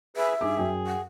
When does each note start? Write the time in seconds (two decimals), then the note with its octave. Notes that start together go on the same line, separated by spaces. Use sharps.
0.17 G#4 B4 E5
0.41 G2 D#4 G#4 D6
0.57 F#2 G5
0.87 F#5